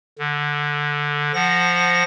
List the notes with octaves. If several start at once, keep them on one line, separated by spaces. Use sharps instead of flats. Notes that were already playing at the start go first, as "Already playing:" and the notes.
D3
F3 F#5 A#6